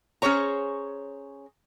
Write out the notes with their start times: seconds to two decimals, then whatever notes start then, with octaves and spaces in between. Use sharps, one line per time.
0.22 C#4 G#4 C5 C#5 A#5